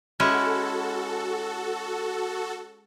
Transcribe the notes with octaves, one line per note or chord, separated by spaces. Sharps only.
G#3 C#4 E4 F#4 A4